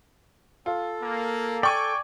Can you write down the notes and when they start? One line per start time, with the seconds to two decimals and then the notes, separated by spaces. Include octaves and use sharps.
0.66 F4 A4
1.03 A#3
1.63 D5 G5 G#5 C#6